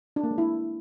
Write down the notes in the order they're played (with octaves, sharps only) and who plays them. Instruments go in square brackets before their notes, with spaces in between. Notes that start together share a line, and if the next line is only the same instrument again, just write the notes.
[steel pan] D4
A#3
G#3
E4